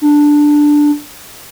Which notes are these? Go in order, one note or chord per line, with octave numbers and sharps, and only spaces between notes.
D4